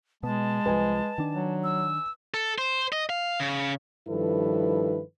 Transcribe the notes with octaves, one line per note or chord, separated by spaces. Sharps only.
B2 G#3 B3 A5
C2 F3 B4 D#5 G#5
D#3 D4
F#3
E6
A4
C5
D#5
F5
C#3
G2 D#3 F3 E4 A4 B4